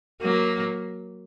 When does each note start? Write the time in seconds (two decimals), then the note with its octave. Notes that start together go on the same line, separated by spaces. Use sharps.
0.22 F#3 A#3